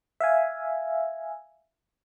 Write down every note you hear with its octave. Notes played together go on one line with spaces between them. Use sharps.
E5 F5 G#5